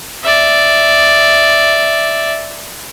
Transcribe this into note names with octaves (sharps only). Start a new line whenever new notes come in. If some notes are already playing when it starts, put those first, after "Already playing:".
D5 E5